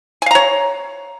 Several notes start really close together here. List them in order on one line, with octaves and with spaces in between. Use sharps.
G#5 F5 A#5 C#5